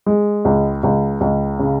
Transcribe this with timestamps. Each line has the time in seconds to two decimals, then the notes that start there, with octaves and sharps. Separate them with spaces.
0.06 G#3
0.45 C#2
0.83 C#2
1.21 C#2
1.59 C#3